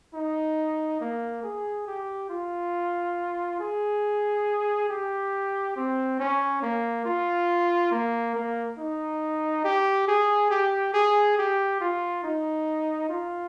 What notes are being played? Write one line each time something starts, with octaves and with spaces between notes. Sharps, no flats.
D#4
A#3
G#4
G4
F4
G#4
G4
C4
C#4
A#3
F4
A#3
A#3
D#4
G4
G#4
G4
G#4
G4
F4
D#4
F4